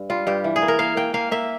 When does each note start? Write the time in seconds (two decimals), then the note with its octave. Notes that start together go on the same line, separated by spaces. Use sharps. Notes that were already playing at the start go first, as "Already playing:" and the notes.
Already playing: G2
0.10 G3 F4
0.27 G2 G4
0.44 E3
0.56 G#4
0.62 A#3
0.68 A#4
0.79 A#3 F5
0.97 A#3 G5
1.14 A#3 F5
1.31 A#3 E5